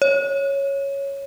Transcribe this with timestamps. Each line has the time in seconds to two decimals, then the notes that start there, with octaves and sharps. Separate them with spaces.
0.02 C#5